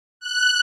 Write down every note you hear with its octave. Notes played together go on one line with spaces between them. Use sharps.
F#6